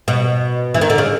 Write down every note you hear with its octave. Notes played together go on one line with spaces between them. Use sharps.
B2
E3
D#3
D3
C#3